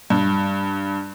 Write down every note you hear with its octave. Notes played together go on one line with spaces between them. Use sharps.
G2